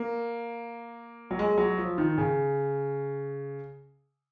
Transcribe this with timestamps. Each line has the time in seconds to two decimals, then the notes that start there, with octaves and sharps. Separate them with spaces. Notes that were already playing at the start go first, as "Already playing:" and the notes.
Already playing: A#3
1.31 F#3
1.39 G#3
1.58 F#3
1.78 F3
1.98 D#3
2.18 C#3